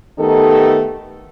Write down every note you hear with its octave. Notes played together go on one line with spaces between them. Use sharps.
D#3 A3 B3 D#4 G4 A4